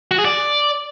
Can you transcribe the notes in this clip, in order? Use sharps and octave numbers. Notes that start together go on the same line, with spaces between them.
F#4
G#4
D5